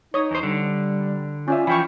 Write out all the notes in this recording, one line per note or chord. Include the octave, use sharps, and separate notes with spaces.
D#4 C#5 D#6
E2 C5
D3 G3
C#4 F4 D5 E5 G#5
E3 F3 F4 G5 B5 C#6